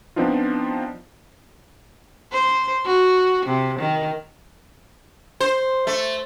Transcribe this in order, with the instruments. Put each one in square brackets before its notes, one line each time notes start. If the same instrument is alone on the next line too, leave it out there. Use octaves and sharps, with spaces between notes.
[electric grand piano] F3 B3 C4 D4 D#4 F4
[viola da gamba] C5
F#4
C3
D#3
[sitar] C5
A3